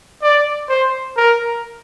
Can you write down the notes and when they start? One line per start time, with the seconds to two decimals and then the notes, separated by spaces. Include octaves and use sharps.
0.23 D5
0.69 C5
1.17 A#4